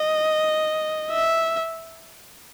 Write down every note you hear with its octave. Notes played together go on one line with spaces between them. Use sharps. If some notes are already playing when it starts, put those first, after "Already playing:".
Already playing: D#5
E5